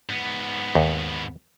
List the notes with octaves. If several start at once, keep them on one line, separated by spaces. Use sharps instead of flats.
G#2 B3
D#2